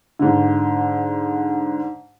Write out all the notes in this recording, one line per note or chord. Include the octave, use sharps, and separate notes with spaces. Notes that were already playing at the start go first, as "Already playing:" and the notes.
G#2 D3